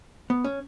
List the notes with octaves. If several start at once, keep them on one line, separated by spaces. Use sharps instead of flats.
B3
C#4